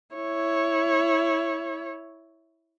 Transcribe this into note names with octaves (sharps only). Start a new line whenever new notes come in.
E4 C#5